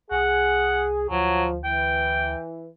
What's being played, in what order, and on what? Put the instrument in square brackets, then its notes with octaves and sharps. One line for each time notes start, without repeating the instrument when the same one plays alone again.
[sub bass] C2 [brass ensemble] G#4 [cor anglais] F#5
[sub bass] D2 [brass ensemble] F3 [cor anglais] F#3
[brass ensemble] E3 [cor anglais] G5